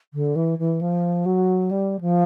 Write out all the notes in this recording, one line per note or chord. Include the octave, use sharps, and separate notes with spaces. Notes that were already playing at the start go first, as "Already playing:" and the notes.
D3
E3
E3
F3
F#3
G3
F3